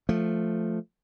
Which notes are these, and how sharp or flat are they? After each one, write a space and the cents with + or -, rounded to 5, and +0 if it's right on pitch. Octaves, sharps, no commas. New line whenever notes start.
F3 +0 A3 +0